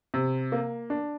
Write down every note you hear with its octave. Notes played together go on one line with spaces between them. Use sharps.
C3
A#3
D4